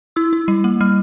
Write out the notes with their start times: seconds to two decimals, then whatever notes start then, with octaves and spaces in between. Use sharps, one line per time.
0.16 E4 E6
0.33 E4
0.48 G3
0.64 A#3
0.81 G3 F6